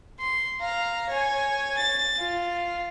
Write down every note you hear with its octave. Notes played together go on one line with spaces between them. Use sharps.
C6
F5 A#5
C#5 G#5
A6
F4